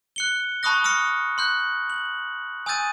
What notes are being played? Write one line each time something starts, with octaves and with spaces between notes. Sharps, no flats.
F#6 C#7 G7
A5 B5 C#6 D#6 F#6 A#6
D#6 F6 A#6 C#7
C6 F#6 G6
F#7
G#5 D#6 E6 G6 A6 D#7